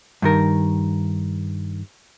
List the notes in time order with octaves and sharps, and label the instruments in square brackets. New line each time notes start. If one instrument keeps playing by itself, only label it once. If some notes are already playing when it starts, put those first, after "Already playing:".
[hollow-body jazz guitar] G2 D#3 A#4